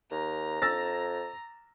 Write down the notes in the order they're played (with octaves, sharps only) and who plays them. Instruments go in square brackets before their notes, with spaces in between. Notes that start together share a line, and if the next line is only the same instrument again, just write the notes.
[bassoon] D#2 [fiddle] A#5
[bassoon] F2 [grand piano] E6 A6 A#6